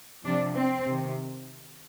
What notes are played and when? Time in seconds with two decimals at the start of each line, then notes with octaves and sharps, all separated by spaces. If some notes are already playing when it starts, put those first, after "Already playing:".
0.25 C3 F3 D4
0.56 C4
0.87 C3 D#3